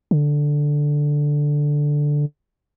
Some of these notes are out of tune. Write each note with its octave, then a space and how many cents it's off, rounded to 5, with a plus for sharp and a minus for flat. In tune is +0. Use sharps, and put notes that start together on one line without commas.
D3 +0